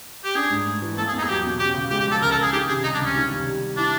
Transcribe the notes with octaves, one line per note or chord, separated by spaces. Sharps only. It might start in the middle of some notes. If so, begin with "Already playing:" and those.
G4
D4 G#4
G#2
A3
E3
A#3 A4
G#4
E2
D#4
G#4
F#3 G4
B2
C#4 G4
C#3
G#3 G4
G4
F3
A4
C#2 A#4
A4
C#2
G#4
D#3 G4
C3 G#4
G3 D#4
D4
C#2
C#4
D#3
C3
G3
G3
D4 E4